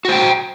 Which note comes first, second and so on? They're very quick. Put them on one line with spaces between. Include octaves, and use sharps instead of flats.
F#4 C5 G5